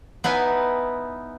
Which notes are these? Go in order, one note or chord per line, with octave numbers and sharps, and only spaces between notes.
B3 D#4 E4 B4 G#5